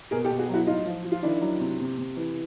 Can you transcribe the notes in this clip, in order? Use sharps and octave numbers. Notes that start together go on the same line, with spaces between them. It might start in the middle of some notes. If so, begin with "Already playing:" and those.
B2 G#4 A#4
G4 A4
B2
F#4 G#4
F#3 E4 F#4
A2 D#4 F4
F3
F3
F4
D#3 D4 E4
F#3
C3
C3
C3
E3